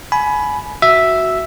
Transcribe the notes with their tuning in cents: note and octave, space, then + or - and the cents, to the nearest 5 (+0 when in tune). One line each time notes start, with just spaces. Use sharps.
G#5 +25 B5 +0
F#4 +0 E5 +0